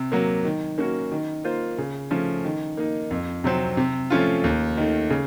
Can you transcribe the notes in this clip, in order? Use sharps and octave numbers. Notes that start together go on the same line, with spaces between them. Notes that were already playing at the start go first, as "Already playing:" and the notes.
Already playing: C3
F#3 A#3
D#3
A#3 C#4 F#4
D#3
A#3 F4 C5
C#3
F3 A3 C#4
D#3
A#3 D#4
F2
C3 F#3 C4
C3
F3 A3 C#4 F4
D#2
D#3 A3
C#3